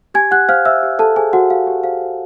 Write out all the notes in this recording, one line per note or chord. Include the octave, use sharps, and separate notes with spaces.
G4 G#5 G#6
G4 F#5 F#6
C5 F5 F6
C5 E5 E6
G4
G4 A4 A5
G#4 C5 G#5
F#4 C5 F#5
G4 F5
G4
C5 F5
C5